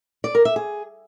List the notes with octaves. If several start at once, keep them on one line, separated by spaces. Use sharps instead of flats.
D5
A#4
E5
G#4